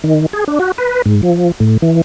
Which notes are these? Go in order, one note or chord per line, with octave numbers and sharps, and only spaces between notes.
D#3
G#4
D4
F#4
B4
G#2
F3
A2
E3